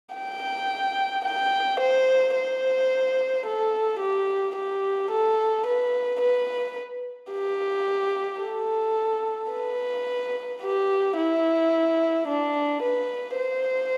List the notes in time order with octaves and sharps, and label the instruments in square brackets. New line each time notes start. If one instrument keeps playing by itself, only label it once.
[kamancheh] G5
G5
C5
C5
A4
G4
G4
A4
B4
B4
G4
A4
B4
G4
E4
D4
B4
C5